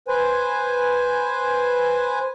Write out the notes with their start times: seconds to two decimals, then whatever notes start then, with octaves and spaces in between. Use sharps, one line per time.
0.08 B4 C5 G#5